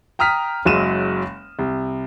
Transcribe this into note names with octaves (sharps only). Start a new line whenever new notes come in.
G5 A#5 D#6 F6 B6
F#1 F#3 G#3 D#7 E7
C2